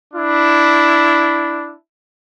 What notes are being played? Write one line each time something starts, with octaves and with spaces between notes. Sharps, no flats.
D4 E4